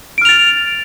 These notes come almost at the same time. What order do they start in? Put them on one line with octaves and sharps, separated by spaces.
D7 F6 F7 A6